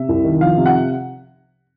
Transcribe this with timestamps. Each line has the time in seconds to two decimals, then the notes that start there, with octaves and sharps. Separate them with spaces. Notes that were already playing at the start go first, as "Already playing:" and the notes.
Already playing: C3 E5
0.09 C2
0.24 D#3
0.41 F3 F5
0.57 C3
0.66 F#5